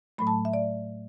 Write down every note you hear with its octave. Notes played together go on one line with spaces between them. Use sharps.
A2 F#3 A3 B5
A5
E5
D5